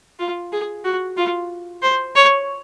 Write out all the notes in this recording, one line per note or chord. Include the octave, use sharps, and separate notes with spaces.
F4
G#4
F#4
F4
C5
C#5